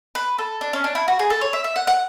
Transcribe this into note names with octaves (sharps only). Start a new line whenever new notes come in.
B4
A4
D4
C#4
D4
E4
F#4
G#4
A4
C#5
E5
E5
F#5
F#5